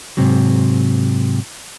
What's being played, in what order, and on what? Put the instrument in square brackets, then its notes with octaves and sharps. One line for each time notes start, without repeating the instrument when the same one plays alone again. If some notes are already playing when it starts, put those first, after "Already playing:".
[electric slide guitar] G#2 C3 F#3